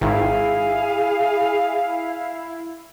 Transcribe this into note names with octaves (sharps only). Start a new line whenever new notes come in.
G#1 E4 G#4 F5